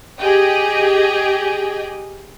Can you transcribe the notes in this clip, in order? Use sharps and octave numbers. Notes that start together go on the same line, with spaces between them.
G4 G#4 D#5 G5